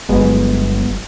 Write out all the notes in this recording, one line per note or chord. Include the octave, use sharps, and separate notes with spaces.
G1 F#3 G#3 B3